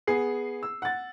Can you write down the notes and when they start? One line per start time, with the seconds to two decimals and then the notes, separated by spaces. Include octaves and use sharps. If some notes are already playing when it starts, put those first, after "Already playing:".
0.07 B3 G#4 C7
0.63 E6
0.82 F#5 A6